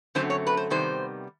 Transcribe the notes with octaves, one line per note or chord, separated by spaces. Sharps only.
F#2 D3 F#3 A3 C4 C5
C#5
B4
C5
C3 D#3 G3 B3 C5